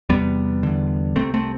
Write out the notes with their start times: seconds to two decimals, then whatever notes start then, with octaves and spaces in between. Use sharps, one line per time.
0.09 E2 C3 G3 B3
0.63 E2 D3
1.16 C2 C3 A3 C4
1.34 A3 C4